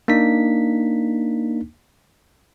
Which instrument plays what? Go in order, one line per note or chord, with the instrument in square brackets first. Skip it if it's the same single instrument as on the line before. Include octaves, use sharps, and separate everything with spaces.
[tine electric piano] A#3 D4 D#4 B6